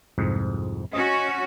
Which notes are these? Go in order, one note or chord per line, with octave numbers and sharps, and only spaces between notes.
C2 F2 G#2
C#4 F#4 D#5